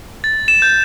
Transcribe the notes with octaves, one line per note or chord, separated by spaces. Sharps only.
A6
E7
G6